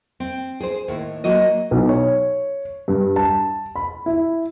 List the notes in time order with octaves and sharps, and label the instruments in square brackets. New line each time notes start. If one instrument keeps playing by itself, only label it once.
[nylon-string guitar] C4
G#4 C5
D#2 A2
F#3 A#3 F#4 D#5
[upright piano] B1
C#5
G2
A5
B5
E4